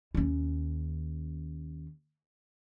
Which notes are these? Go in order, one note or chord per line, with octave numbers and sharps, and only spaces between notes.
D#2 C#4